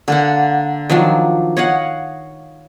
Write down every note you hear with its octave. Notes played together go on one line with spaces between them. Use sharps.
D3 A#3 F#5
D#3 F3 F#3 D4
C#5 D#5 F5 F#5